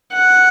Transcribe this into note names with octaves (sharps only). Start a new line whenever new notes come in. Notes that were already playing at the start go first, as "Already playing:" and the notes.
F#5